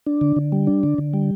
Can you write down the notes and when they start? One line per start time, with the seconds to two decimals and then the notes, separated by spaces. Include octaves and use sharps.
0.06 D4
0.21 D3
0.36 D3
0.52 G3
0.67 D4
0.83 D3
0.98 D3
1.13 G3